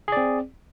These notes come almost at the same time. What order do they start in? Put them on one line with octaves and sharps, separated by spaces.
G#4 D5 C4